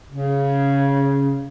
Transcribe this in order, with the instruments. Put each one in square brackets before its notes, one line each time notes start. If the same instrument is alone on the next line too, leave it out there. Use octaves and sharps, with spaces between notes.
[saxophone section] C#3